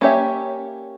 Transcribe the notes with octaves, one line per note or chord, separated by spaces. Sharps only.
A#3 C#4 G4 C#5 E5